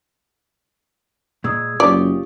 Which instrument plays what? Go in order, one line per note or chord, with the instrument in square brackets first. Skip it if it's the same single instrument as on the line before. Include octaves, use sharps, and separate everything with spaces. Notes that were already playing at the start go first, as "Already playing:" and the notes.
[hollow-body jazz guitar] A#2 G#3 [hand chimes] D#6 E6 G#6
[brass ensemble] F#1 [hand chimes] C#4 D#6 [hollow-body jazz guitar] F4 G4 C#5 [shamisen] D5